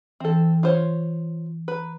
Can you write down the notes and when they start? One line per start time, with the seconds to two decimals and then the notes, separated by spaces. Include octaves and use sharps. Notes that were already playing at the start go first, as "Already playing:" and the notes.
0.20 E3 C4 A4
0.63 F4 C5 C#5
1.68 B4 A#5